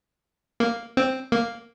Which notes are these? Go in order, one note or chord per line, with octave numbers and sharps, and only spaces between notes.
A#3
C4
A#3